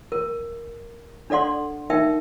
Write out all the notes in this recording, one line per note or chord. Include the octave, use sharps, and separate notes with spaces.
A#4
D4 A4 D5 F#5 C6
D#4 A#4 E5 G5